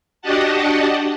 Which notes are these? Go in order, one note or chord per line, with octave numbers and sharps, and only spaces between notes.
D4 F#4 G4 D#5 F#5 A5